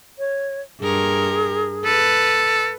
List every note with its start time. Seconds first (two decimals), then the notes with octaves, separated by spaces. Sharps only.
0.19 C#5
0.80 G2 G#4 A#4
1.85 A4 B4